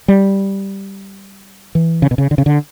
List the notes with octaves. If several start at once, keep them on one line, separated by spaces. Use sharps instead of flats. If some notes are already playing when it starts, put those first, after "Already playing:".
G3
E3
C#3
B2
C#3
D3
C#3
D3